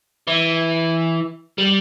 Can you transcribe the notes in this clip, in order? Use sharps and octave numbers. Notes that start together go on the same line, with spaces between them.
E3
G3